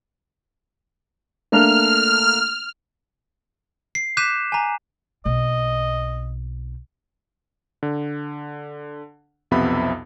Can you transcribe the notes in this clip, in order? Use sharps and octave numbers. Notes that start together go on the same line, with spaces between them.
A3 A#3 D4 F6
C7
D6 F#6 G6 B6 D#7 E7
G#5 A#5
B1 C4 D#5
D3
B1 F2 C3 B3 E5 B5